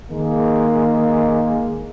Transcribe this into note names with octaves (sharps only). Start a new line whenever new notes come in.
D#3 G#3 A#3